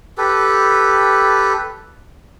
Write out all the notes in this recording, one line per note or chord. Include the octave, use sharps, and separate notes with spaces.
G4 A4 B4